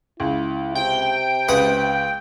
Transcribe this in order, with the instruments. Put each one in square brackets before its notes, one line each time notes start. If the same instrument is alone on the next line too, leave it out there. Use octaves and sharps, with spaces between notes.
[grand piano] C#2 [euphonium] E4
[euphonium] C3 [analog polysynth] G5
[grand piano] C#2 [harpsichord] B4 F#5 D#6